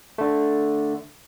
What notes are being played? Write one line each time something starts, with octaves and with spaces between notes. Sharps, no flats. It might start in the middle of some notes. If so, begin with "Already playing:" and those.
D3 A3